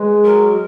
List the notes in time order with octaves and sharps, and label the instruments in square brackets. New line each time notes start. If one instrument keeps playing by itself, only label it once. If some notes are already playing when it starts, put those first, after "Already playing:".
Already playing: [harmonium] G#3 [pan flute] B4
[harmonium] F#3 [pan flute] A#4